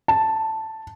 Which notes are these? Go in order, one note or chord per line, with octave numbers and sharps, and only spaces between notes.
A5